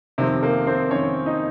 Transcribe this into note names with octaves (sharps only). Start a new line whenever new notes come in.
F2 C3 D#3 C4
A#3 A#4
C4 C5
F2 D#3 C#4 C#5
D#4 D#5